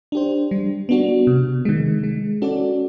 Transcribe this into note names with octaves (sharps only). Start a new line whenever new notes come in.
D4 G4 C5
G3
B3 D4 F#4
C3
D#3 G#3
G#3
C#4 F#4 A4 D5